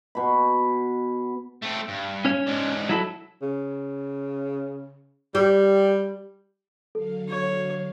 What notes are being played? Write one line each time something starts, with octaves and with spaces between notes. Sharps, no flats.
B2 B5
A3 C4
G2
C#4 C#5
G#2 D3
F#3 E4 A4
C#3
G3 G4
D3 F#3 A4 F5
C#5